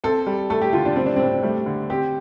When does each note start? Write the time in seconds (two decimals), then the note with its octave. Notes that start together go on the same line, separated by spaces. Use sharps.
0.04 C4 A4
0.27 G3
0.50 A3 A4
0.62 G4
0.73 D3 F4
0.85 D4
0.96 G3 C4
1.06 D4
1.16 A2 C4
1.43 G3 A3
1.66 D3
1.90 C4 G4